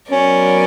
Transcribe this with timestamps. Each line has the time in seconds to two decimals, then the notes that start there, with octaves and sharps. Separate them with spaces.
0.11 F#3 B3 C#4 F#4 A#4 D5